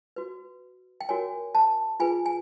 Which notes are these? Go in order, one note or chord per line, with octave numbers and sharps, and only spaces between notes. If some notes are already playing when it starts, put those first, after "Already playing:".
F#4 B4
G5
F#4 A#4 C#5 G#5
A5
F4 G#4 B4 G#5
G#5